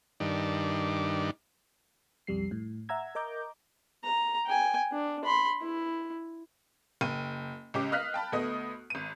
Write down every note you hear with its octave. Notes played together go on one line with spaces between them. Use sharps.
G2 D#3 D4
B1 F2 G3 C7
A2
E5 F#5 A#5 E6 G#6
A#4 D#5 A#5 D6 G6
A#5
G5 G#5
D4
B5 C6
E4
F#1 G5 D#7
C#2 C#4 G4 D6
D#5 F5 F6 F#6 B6
G5 A5 B5
D2 A3 B3 D#5 D#6
G#1 D#7